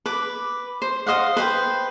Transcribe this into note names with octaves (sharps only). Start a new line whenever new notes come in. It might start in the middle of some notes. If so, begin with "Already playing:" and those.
B4 D6
C5
C5 D#5 F5 F#5
B4 C5 G5